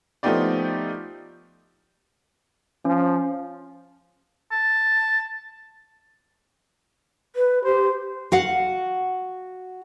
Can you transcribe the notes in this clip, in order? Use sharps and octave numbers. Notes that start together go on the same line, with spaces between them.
F3 A3 B3 D#4 G4 D5
F3 C#4
A5
B4
G4 C5
F#4 F5 F#5